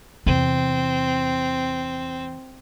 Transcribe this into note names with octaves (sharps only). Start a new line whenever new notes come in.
E2 C3 C4